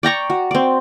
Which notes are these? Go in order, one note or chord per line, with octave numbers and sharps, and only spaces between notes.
D5 G5 A#5 C#6
F#4
C4 D5